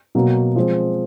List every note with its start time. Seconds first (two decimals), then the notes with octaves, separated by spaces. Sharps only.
0.15 B2 F#3 A#3
0.56 F3 G#3 C4